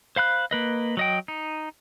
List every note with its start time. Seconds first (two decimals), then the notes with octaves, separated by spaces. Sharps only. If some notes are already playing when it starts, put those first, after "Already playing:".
0.16 C5 F5 B5 F#6
0.51 A#3 B4 D#5
0.97 F#3 D#5 G5
1.28 D#4